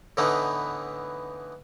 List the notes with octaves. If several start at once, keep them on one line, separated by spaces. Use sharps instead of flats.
A2 D3 E3 A3 B3 D#4